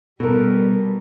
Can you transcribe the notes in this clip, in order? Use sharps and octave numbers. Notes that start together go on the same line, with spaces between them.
B2 G3 A4 A#4